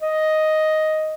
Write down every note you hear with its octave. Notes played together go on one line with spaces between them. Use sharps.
D#5